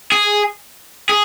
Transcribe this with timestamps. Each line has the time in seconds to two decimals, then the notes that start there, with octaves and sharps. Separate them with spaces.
0.12 G#4
1.09 G#4